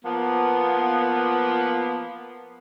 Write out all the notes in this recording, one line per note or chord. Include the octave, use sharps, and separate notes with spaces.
F3 A#3 B3